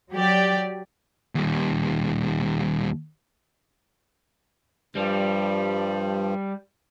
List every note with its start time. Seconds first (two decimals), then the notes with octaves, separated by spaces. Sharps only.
0.12 F#3 G4 D5
1.35 D#2 G3
4.95 G2 F3 G3